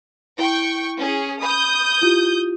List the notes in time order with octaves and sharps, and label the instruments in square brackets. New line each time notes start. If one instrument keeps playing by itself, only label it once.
[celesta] E4 [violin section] G5 C#6
[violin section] C#4 G#4
[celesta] B5 [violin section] D#6 G6
[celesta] E4 F4 G4